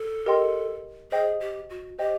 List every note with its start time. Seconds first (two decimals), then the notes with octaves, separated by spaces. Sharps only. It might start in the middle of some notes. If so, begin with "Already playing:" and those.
Already playing: A4
0.26 G4 A#4 D#5 G5 C6
1.12 G#4 C5 D#5 G5
1.41 G4
1.70 F#4
1.99 G4 C5 D#5 G5